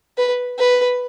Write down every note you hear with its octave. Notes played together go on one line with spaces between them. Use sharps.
B4
B4